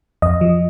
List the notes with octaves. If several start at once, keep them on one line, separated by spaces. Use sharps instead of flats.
F2 D#5
F3